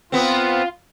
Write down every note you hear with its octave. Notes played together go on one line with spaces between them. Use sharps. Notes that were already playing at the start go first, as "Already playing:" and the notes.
B3 C4 F4